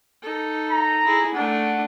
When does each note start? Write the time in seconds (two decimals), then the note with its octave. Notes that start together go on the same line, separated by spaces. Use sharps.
0.22 D#4 A4
0.71 A#5
1.05 E4 G#4
1.34 A3 D4 F#5